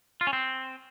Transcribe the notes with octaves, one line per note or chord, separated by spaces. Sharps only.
F4
C#4
C4